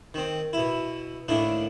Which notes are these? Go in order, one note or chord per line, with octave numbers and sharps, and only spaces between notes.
D#3 C4
B2 E4
A2 D#3 A#3 D4 E4